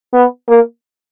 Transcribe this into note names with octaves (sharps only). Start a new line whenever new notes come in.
B3
A#3